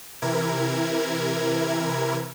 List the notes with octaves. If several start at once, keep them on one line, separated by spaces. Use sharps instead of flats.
C3 E3 E4 A#4 G#6